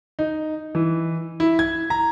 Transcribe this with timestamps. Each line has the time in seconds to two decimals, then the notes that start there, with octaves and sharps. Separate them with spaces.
0.19 D#4
0.75 E3
1.40 E4
1.59 G#6
1.90 A#5